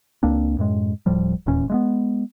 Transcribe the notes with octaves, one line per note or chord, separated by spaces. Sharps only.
C#2 A#3 C4 D4
F#2 A2 G#3
D1 A2 F3 G3
D#1 E2 A#2 C#4
G#3 A3 B3